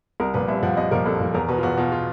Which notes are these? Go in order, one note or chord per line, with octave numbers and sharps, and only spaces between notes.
C2 A#4
A#2 F3 B4
C2 E5
A#2 F3 F#5
C2 D#5
A#2 F3 A#4
C2 A4
A#2 F3
E2 A#4
B2 B4
F4
E2 F#4
B2 F4
F4